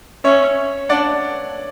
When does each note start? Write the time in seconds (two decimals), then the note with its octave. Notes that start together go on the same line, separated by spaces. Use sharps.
0.24 C#4 C#5 E5
0.89 D4 D5 F#5